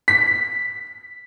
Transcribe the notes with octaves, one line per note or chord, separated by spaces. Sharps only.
B6